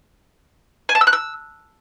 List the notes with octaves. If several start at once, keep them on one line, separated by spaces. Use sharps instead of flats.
G#5
A5
E6
F#6
E6